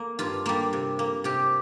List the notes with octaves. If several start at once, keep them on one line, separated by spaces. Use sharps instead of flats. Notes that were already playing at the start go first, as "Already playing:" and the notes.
Already playing: A#3
G2 F4
G3 A#3
C3
A#3
C3 G4